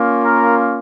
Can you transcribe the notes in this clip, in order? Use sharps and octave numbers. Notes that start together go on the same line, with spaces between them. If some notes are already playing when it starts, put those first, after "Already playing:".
Already playing: A#3 C#4 F4
A#4